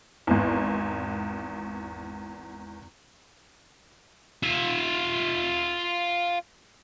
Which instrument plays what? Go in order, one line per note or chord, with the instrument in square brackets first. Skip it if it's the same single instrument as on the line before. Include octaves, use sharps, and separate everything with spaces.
[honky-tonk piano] G#1 E2
[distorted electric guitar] F4 E5